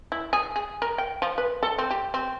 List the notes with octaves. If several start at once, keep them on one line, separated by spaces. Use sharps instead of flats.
E4
G#4
G#4
A#4
G5
F3
B4
A4
C4
G4
C4